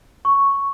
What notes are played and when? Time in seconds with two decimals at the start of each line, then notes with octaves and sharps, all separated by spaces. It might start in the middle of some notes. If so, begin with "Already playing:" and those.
0.25 C#6